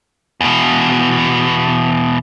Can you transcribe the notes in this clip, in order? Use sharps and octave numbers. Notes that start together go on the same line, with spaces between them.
E2 B2